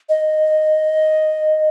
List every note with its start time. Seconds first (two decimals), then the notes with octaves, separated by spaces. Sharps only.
0.09 D#5